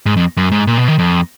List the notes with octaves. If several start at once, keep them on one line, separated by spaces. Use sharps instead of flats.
G#2
F2
F#2
G#2
A#2
B2
D#3
F2